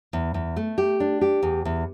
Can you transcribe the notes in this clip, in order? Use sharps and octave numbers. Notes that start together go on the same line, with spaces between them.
E2
E2
A3
G4
D4
G4
E2
E2